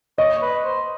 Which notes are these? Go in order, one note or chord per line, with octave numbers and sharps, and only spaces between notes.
C#5 D#5
B4
C5